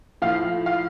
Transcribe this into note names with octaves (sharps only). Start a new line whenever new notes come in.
A2 F3 F5
F5